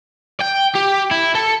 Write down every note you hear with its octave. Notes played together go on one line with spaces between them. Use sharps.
G5
G4
E4
A4